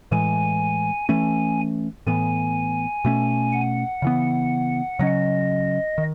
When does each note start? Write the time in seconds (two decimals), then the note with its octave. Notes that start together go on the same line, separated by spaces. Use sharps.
0.11 A2 E3 G#3 G#5
1.09 E3 A3 C#4 G#5
2.07 A2 E3 B3 G#5
3.05 B2 A3 C#4
3.53 F#5
4.02 C#3 E3 B3
4.99 C#3 F#3 C#4 D#5
5.98 D#3